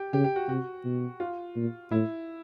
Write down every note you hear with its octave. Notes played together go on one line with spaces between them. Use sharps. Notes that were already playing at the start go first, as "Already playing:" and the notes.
Already playing: G4
C#3 G4
G4
F#4
C3 F#4
B2
F4
A#2
A2 E4